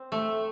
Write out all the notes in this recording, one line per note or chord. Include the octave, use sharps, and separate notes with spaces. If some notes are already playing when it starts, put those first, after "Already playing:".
Already playing: C4
A3